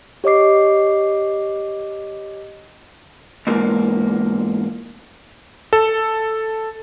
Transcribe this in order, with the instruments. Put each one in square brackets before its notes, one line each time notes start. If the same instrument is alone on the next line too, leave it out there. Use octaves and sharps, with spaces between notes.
[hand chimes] G4 C#5 D#5 D6 C7
[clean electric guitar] E2 G#2 A#3
[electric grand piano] A4